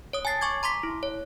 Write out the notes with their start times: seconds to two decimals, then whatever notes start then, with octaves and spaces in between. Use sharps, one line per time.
0.13 C#5 D#6
0.25 G#5 A5 A6 C7
0.41 G#5 C#6 D6 G#6
0.63 A#5 C6 D6 B6
0.83 E4
1.03 C#5